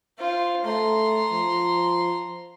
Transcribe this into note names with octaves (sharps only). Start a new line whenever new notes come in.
F4 C5
A3 A#5 C6
F3